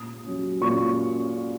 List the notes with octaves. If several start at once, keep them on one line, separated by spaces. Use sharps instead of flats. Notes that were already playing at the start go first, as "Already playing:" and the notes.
Already playing: A#2 D#6
F#3 C#4
A#2 C#6